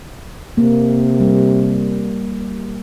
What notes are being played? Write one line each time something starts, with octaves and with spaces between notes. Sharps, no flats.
C3 A#3
G3